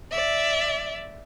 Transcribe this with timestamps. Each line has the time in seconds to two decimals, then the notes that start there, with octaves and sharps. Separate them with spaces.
0.11 D5 E5